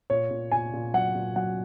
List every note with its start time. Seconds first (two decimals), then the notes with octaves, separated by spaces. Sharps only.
0.10 A#2 C#5
0.31 A#2
0.52 A#2 G#5
0.73 A#2
0.94 F#3 F#5
1.15 A#2
1.36 F#3 F#5